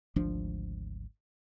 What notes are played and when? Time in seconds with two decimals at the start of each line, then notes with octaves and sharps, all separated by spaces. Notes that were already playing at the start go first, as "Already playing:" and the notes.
0.16 G#1 D2 F3 D4